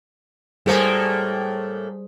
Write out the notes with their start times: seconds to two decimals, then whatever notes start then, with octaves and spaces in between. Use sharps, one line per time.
0.66 A2 G3 A3 A#3 G#4 C5